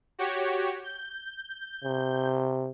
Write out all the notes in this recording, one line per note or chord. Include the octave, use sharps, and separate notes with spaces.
F#4 G4 C#5
G6
C3